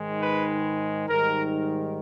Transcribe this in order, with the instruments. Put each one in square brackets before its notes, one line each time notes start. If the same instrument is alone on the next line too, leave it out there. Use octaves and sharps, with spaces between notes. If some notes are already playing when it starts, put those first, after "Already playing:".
Already playing: [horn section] G#2 D#3 G#3
B4
G#2 D#3 G3 A#4